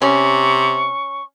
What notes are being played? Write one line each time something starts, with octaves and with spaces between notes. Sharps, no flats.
C3 C#4 C#6